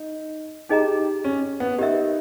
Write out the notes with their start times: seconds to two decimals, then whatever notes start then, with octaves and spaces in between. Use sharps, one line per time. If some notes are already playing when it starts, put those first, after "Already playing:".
Already playing: D#4
0.69 D#4 G4 G#4 D#5 A#5
1.24 C#4
1.60 B3
1.79 D#4 G4 A#4 E5